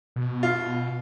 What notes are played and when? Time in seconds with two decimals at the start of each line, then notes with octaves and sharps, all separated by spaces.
0.16 B2
0.43 F4